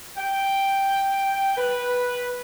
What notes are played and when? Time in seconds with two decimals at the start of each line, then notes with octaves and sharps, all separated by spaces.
0.17 G5
1.57 B4